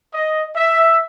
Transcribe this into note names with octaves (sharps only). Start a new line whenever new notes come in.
D#5
E5